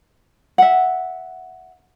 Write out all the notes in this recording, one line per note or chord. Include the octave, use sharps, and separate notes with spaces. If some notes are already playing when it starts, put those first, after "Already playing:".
E5 F#5